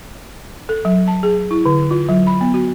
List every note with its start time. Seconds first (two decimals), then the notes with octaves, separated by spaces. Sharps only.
0.69 A4
0.85 F#3
1.08 A5
1.23 G#4
1.51 E4
1.66 D3
1.91 F4
2.09 F#3
2.27 B5
2.41 B3
2.54 F#4